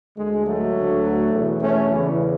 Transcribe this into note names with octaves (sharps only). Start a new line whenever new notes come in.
D2 D3 G#3
F#3 A3
D2 D3
E2 B2
A3 C#4
E2 C#3 E3